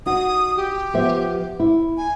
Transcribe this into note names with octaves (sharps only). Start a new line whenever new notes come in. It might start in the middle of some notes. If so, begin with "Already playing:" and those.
D#4 F#4 D#6
G4
F3 B3 E5
E4
G#5